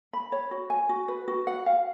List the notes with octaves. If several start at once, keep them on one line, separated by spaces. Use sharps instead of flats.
B5
C#5
F#4
G#5
F#4
B4
F#4
F#5
F5